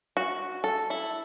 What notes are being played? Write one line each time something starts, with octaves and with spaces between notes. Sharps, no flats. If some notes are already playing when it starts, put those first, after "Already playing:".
F#4
A4
E4